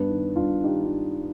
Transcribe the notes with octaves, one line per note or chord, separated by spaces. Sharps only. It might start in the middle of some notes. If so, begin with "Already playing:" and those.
Already playing: G2 B3 D4
D#3
G2 D4 F4
D#3 D#4 G4
D4 F4